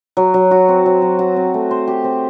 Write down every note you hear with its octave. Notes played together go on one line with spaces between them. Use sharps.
F#3
F#3
F#4
C4
F#3
F#3
F#4
C4
A3
C5
G4
C4